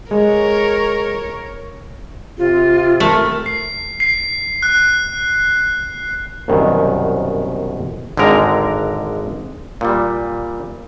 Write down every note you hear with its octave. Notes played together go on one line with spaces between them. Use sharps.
G#3 A#4 C#5
C3 F4
A3 A#4
C7
C7
F#6
C2 F#2 B2 D#3
G#1 D3 G#3 A#4 A#5
A#2 G3